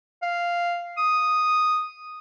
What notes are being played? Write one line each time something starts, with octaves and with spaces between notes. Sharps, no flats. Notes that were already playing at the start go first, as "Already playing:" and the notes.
F5
D#6